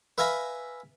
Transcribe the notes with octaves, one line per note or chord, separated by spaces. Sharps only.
B4 E5 F5 G#5 A#5 B5